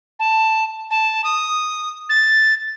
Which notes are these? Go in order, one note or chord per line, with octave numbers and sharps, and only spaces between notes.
A5
A5
D#6
A6